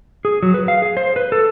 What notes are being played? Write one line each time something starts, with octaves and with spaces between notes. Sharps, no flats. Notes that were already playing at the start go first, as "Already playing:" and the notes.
G#4
F#3
B4
F5
G#4
C5
B4
A4